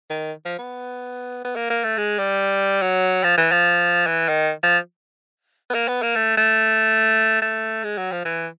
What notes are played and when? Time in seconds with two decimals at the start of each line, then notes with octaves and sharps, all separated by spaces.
0.10 D#3
0.45 F3
0.59 B3
1.45 B3
1.56 A#3
1.70 A#3
1.84 A3
1.98 G#3
2.19 G3
2.82 F#3
3.24 F3
3.38 E3
3.52 F3
4.07 E3
4.28 D#3
4.63 F3
5.70 B3
5.74 A#3
5.88 B3
6.02 A#3
6.16 A3
6.37 A3
7.42 A3
7.84 G#3
7.98 F#3
8.12 F3
8.25 E3